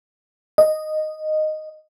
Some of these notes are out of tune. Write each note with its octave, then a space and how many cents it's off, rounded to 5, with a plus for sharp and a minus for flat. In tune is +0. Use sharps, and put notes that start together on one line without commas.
D#5 -10